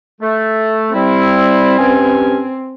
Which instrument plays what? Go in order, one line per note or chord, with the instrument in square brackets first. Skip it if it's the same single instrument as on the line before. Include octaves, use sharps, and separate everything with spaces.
[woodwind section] A3
[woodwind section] G3 E4 [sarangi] C4
[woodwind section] G2 C#4 G#5